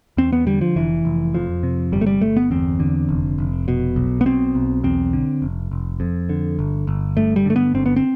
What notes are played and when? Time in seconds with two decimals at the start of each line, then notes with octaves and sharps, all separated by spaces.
0.17 E2 C4
0.33 B3
0.47 D3 G3
0.61 F3
0.76 F1 E3
1.05 F1
1.34 F2 F3
1.63 C3
1.92 G1 G3
2.01 A3
2.06 G3
2.21 G1 A3
2.36 B3
2.51 E2 C4
2.80 D3
3.09 F1
3.38 F1
3.68 B2
3.96 B1
4.21 B3
4.26 B2 C4
4.55 B1
4.84 E2 C4
5.13 D3
5.42 F1
5.71 F1
6.00 F2
6.29 D3
6.59 G1
6.87 G1
7.17 G2 A3
7.36 G3
7.46 D3 A3
7.56 B3
7.74 G1 C4
7.86 B3
7.96 C4